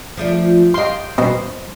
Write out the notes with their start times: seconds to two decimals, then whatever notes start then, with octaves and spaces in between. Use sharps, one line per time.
0.17 F3 A3 D4
0.74 G4 D#5 F5 C6
1.18 B2 C5